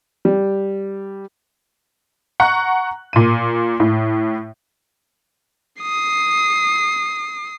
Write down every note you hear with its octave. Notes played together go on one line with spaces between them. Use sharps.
G3
F#5 A#5 C#6 F#6
A#2 D#7
A2
D#6 C7